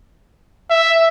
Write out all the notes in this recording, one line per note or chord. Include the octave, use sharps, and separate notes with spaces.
E5